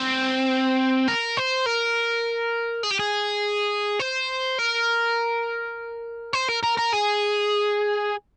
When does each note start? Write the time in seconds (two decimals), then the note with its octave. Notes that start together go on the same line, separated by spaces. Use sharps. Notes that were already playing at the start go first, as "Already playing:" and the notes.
Already playing: C4
1.08 A#4
1.37 C5
1.66 A#4
2.83 G#4
2.91 G4
3.00 G#4
4.00 C5
4.59 A#4
6.33 C5
6.48 A#4
6.63 A#4
6.77 A#4
6.92 G#4